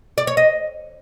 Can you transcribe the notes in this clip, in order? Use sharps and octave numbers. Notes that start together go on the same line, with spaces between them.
D5
C#5
D#5